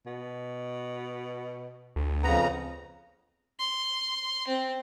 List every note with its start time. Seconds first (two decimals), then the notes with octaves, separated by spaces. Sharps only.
0.06 B2
1.96 D2
2.23 F2 C#3 B3 A#5
3.59 C6
4.48 C4